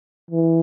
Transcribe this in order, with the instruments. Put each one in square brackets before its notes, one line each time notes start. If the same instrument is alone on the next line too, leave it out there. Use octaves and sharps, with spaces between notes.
[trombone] E3